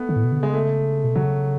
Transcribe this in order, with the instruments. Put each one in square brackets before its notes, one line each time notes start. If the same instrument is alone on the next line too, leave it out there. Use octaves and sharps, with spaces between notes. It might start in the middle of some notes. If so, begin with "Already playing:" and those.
Already playing: [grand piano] A3 B3
[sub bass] D3
A2
B2
D3
[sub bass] C#3 [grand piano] G#3
[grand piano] A3
[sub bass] B2
[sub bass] C#3 [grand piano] F#3